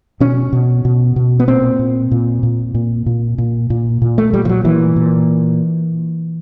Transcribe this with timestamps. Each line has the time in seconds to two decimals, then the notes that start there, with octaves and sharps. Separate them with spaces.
0.20 B2 C#4
0.53 B2
0.85 B2
1.16 B2
1.40 B3
1.48 A#2 C4
1.79 A#2
2.11 A#2
2.43 A#2
2.75 A#2
3.06 A#2
3.38 A#2
3.70 A#2
4.02 A#2
4.18 A3
4.33 A#2 G3
4.45 F3
4.49 F#3
4.65 A#2 E3
4.96 A#2